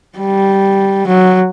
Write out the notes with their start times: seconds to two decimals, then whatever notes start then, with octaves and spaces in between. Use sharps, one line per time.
0.18 G3
1.07 F#3